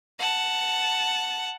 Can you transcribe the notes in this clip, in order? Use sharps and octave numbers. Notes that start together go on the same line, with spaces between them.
F#5 A5